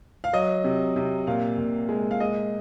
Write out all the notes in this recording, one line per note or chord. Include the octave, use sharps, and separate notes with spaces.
F5
F#3 D#5
C3
C3
A#2 F5
A#2
G#3
F5
G#3 D#5